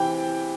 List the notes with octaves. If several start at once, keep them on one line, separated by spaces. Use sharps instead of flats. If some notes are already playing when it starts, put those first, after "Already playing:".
Already playing: C3 E3 G5